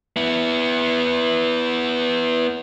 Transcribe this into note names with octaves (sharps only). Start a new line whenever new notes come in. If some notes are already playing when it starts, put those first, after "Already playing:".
B3 E4